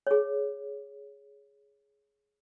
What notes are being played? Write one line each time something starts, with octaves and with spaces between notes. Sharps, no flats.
G#4 C#5